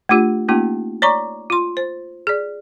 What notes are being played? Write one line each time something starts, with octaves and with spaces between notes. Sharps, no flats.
A3 D4 F4 G4
A3 A#3 C#4 D#4 F4 G4
C#5 D5 A#5 C#6 D6
F4 C6
C5
G#4 D5